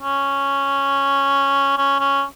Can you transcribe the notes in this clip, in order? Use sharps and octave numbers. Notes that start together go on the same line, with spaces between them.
C#4
C#4
C#4